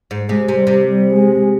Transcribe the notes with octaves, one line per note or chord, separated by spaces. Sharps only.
G#2
C3 G#3
C3
G3
C3
G3
G#3